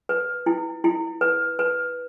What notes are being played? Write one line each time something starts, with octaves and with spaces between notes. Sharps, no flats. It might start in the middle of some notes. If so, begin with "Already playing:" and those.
B4
E4
E4
B4
B4